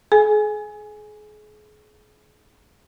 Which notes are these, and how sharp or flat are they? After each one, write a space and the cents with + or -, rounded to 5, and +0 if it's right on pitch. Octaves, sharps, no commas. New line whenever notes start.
G#4 +35 G#5 +0